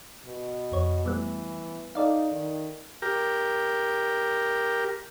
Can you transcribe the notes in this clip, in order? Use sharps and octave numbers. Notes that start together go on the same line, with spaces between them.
B2
F2 C#5
E3 G3 A3 B3
D#4 A4 D5 F5
D#3
G4 A#4